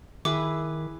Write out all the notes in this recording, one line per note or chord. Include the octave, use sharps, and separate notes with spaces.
D#3 E4 G#4 B4 D6